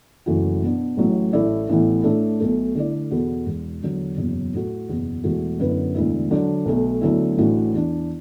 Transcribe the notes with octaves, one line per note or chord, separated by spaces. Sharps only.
F#1 F#2 E3 A3 F#4
B2 B3 D4
A1 A2 F#3
A1 A2 A3 E4 D5
A1 A2 E3 B3
A2 A3 D4 A4
B1 B2 A3
D3 A3 E4 D5
E2 B2 B3 F#4 A4
E1 E2 B2
E2 D3 F#3
F#1 E2 B2 F#3 B3
A2 A3 F#4 A4
F#1 E2 B2 B3
E1 E2 E3 A3 F#4
F#2 D3 B3 E4 B4
E1 D2 D3 B3 E4
D3 F#3 D4
B1 B2 A3
D2 D3 F#3 B3 E4
A1 A2 E3 D4 F#4
E2 E3 D4